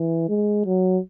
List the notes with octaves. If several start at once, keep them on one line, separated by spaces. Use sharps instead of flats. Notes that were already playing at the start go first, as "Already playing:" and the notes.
Already playing: E3
G#3
F#3